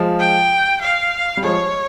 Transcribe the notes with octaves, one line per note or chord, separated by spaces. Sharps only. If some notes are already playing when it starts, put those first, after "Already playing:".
Already playing: F3 G#3
G5
F5
G3
F3 G#3 C#5